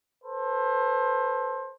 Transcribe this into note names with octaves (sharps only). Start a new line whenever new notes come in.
A4 B4 C5